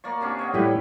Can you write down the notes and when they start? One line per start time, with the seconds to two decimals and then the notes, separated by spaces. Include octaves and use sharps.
0.04 A#3 D5 C#6
0.21 C3 C#4 D4
0.39 C#5 D#5 F#5
0.54 A2 G3 E4 G4 B4